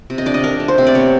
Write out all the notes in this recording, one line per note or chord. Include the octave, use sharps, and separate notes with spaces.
C3
D#5
D4 D5
D#5
D4 A#4
A3
C5
C3
D5
B3 C#5